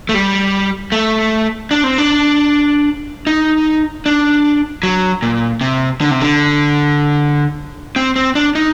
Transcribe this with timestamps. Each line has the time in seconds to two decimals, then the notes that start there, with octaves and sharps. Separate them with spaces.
0.09 A3
0.14 G3
0.92 A3
1.71 D4
1.84 C4
1.98 D4
3.27 D#4
4.06 D4
4.83 F#3
5.22 A#2
5.61 C3
6.01 D3
6.11 C3
6.22 D3
7.96 C4
8.16 C4
8.35 D4
8.55 D#4